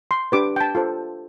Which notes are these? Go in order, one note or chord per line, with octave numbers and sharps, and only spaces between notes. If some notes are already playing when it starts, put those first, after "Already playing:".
C6
D4 G4 B4 D6
G5
A5
F4 A4 C5